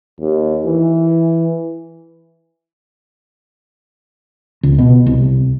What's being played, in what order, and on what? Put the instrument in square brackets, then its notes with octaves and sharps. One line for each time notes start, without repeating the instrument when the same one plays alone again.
[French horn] D#2
E3
[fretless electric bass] C#2
B2
C2